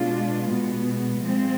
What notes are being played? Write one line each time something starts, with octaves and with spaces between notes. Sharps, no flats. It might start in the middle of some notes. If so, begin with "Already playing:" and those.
Already playing: B2 G#3 D4 F4
B2 G#3 B3
F3 G#3 C4